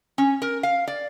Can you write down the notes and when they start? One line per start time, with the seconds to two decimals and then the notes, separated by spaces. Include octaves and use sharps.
0.18 C#4
0.42 A#4
0.63 F5
0.87 D5